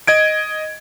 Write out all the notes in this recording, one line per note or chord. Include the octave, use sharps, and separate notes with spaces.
D#5 G#6 D7